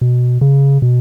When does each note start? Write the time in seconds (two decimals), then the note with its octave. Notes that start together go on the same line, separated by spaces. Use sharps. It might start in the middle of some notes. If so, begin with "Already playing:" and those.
0.01 B2
0.41 C#3
0.82 B2